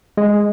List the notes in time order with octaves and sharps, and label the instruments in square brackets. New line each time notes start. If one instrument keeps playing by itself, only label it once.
[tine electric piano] G#3